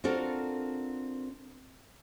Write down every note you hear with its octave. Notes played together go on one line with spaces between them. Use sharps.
C4 D4 F4 F#4 A4 A#4